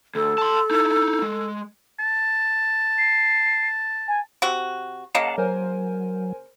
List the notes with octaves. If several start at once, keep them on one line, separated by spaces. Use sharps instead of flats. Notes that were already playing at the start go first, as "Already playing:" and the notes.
D2 A4
A5 C6
D#4 E4
G#3
A5
C7
G#5
C3 F#4
C#3 A#3 D#5 F5 F#5 A5
F#3 A#4 C5 G#5